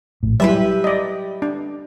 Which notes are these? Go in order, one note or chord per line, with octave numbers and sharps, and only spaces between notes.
A#1 A2
F#3 G3 E4 G4 B4 E5
D5 D#5
D4